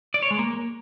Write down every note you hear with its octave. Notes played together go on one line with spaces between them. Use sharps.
D5
C#5
G#3
A#3